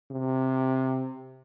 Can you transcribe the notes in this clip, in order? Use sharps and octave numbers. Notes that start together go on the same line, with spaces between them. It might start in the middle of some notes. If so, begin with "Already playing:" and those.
C3